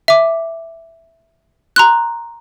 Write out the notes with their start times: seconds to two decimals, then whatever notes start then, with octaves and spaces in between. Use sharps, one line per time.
0.08 E5 D6
1.76 A#5 C6 F#6